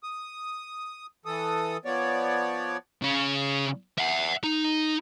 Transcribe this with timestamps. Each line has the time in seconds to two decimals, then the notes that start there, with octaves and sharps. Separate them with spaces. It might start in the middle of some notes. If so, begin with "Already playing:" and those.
0.03 D#6
1.26 E3 A4 D#6
1.85 F3 B3 C#5 D5
3.02 C#3 C#4
3.98 E5 F#5
4.44 D#4